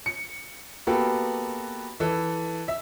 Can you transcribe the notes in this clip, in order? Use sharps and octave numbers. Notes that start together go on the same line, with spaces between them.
C#7
A#3 B3 F#4 G4 A4 B4
E3 A4
E5